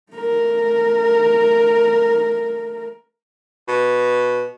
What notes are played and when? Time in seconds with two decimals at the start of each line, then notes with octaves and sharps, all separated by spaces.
0.12 A3 A#4
3.68 B2